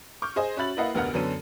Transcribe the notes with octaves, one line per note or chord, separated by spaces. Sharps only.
C#6 D6 F6 G6
G#4 C5 D#5 G#5
C#4 F#4 E5 B5 A6 F#7
A#3 E4 B4 D#5 F5 F#5
F1 D2 B3 A#4 F#5 F6
F#2 D3 B3 C#4 A4 D#7